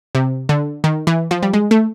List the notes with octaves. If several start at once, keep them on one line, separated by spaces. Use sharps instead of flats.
C3
D3
D#3
E3
F3
G3
G#3
A3